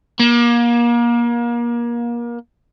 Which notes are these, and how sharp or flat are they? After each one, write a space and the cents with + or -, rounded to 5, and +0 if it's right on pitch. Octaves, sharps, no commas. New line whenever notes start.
A#3 +30